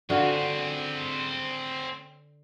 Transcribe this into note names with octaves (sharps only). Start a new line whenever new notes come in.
D3 C4 F4 F#4 G#4